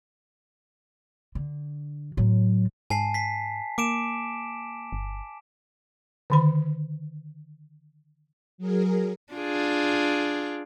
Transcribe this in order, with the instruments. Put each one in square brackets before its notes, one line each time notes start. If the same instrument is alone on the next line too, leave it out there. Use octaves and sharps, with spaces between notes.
[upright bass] D3
A2 F#3
[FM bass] G#2 [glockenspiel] G#5 A5 C7
[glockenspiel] B6 C7
[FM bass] A#3 [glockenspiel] D6 D7 E7
[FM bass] G1
[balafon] D3 D#3 B5
[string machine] F#3 G#4 A#4
[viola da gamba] D4 F4 G#4